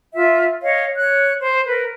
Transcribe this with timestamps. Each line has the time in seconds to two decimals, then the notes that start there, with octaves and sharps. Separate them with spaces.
0.14 F4 E5
0.62 C#5 D#5 F5
0.96 C#5 F#6
1.39 C5
1.66 A#4 B4